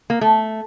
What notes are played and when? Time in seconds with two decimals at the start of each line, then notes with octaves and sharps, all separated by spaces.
0.10 A#3
0.21 A3